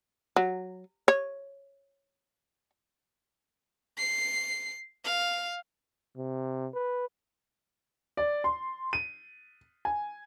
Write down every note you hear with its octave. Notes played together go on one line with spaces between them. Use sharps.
F#3
C#5
C7
F5
C3
B4
D5
C6
D#7
G#5